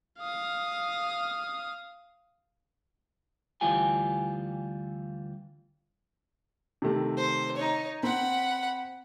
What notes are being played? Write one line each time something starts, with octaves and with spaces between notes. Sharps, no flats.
F5 D#6
D2 E3 G3 F4 G4 G#5
C3 D#3 A3
C5
D#4 C#5
C4 F#5 B5